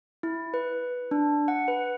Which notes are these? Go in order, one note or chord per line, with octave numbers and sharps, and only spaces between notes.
E4
B4
D4
F#5
B4